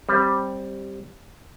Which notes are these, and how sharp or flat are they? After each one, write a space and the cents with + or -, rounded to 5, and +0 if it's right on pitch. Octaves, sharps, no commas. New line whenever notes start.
G3 +0 C4 +20